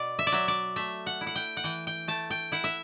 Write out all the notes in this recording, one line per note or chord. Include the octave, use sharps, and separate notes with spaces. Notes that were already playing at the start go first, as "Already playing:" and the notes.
Already playing: B2 D5
E5
D5
F#3 E5
D5
A3 E5
F#5
E4
F#5
G5
F#5
E3 G5
G5
A3 A5
G5
E4 F#5
E5